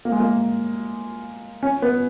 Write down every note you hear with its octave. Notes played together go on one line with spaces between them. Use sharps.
A#3
G#3
A#3
C#4
B3